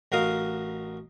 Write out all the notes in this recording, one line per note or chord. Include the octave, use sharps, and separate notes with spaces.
A1 F#4 A#4 D#5 F5 D#6